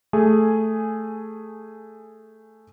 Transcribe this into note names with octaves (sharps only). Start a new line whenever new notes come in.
A3 G#4 G#5